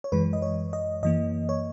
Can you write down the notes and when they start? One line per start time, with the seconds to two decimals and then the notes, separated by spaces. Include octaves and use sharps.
0.04 C#5
0.12 F#2 E3 G#3 B4
0.33 D#5
0.42 C#5
0.73 D#5
1.03 F#2 E3 A#3 D#5
1.49 C#5